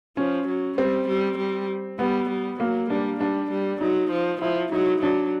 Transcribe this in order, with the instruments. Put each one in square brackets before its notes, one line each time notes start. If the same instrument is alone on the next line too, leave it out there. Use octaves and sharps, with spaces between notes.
[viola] F3 [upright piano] C#4
[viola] F#3
[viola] G3 [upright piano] C4
[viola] G3
G3
[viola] G3 [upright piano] B3
[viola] G3
[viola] F#3 [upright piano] A#3
[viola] G3 [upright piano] D4
[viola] G3 [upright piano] D4
[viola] G3
[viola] F#3 [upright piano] D#4
[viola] F3
[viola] F3 [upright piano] E4
[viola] F#3 [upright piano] D#4
[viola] F#3 [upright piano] D4